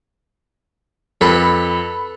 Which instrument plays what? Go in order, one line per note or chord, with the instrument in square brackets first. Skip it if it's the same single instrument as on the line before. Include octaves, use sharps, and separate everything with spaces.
[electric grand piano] F2 [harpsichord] A4 B4 [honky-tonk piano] B5